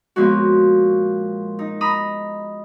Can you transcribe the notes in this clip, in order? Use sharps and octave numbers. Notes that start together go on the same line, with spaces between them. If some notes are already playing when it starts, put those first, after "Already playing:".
A#2 F3 G#3 B3 C#4 F#4
D#4
A#5 B5 D#6